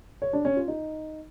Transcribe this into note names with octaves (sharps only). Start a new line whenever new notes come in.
C#5
D4
C#4
F4
D#4